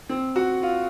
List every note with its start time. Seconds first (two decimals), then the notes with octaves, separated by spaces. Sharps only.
0.09 C4
0.36 F#4
0.63 F4